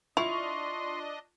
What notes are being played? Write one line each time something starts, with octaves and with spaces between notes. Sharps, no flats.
D4 E4 F4 D#5 C6 C#6 F7